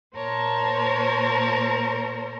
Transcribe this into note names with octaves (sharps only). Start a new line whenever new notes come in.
A#2 A#4 C5 C#5 A5